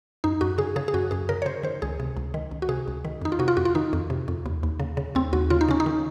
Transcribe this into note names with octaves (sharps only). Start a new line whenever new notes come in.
F#2 D#4
F#2 F#4
C#3 G#4
C#3 G#4
G#4
F#2 F#4
F#2 G#4
C#3 A#4
C#5
C#3 C5
D#3 C5
C#2 G#4
C3
C#2
D#3
C#2
F#4
C3 G#4
C#2
D#3
F2 D#4
F4
C3 F#4
F4
F2 F#4
F4
D#3 D#4
F2
C3
F2
D#2
D#2
C#3
C#3
D#2 C4
D#2 F#4
C#3 F4
D#4
C#3 C#4
D#4
D#3